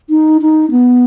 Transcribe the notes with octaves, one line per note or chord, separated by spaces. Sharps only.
D#4
D#4
B3